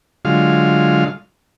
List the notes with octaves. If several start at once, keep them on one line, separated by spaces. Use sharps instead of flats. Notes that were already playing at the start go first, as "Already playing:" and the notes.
D3 F#3 G#3 F4 F5